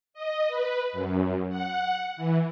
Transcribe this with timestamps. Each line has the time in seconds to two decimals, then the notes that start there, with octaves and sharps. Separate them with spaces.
0.14 D#5
0.48 B4
0.93 F#2
1.49 F#5
2.17 E3